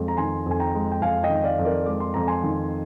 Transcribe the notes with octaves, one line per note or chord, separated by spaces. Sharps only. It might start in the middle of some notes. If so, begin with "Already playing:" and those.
Already playing: F2 G#3
A#5
D#3 G#5 C6
F2 G#5
G5 A#5
G#3
G5
F2 F5 G#5
D#5 G5
D#3
D5 F5
F2
A#4 D5
G#3 D6
C6
F2 A#5
G#5 C6
D#3